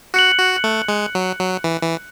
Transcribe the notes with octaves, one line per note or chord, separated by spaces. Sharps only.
F#4 F#6 C#7 F#7
F#4
A3
G#3
F#3
F#3
E3
E3